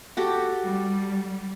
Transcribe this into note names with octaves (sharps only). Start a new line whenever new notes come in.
F#4 G4 A4
G3